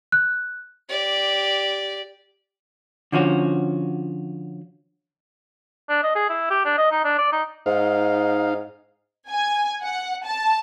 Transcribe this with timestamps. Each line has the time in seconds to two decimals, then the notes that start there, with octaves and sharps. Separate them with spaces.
0.12 F#6
0.89 G4 D5
3.12 D3 F3 C#4 F#4
5.89 D4
6.03 D#5
6.15 G#4
6.29 E4
6.51 G4
6.65 D4
6.78 D#5
6.91 D#4
7.04 D4
7.18 D5
7.32 D#4
7.66 G#2 D#4 F5
9.29 G#5
9.81 F#5
10.25 A5